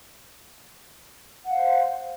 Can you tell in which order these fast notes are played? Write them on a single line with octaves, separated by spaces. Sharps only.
F#5 F5 C5